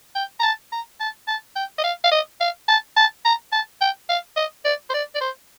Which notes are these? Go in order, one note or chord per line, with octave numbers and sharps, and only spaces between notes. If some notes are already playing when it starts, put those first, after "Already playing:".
G5
A#5
A5
A#5
A5
A5
G5
D#5
F5
F5
D#5
F5
A5
A5
A#5
A5
G5
F5
D#5
D5
C5
D5
D5
C5